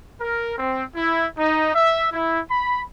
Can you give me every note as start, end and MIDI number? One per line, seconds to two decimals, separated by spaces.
0.21 0.55 70
0.58 0.84 60
0.95 1.26 64
1.37 1.73 63
1.74 2.08 76
2.12 2.40 64
2.50 2.81 83